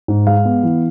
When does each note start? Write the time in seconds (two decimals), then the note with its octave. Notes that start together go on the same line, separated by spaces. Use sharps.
0.08 G#2
0.27 G#3 F5
0.45 B3
0.63 E3